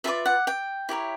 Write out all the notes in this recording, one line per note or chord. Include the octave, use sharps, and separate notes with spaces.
F4 G#4 B4 D5 E5
F#5
G5
E4 G4 A#4 C#5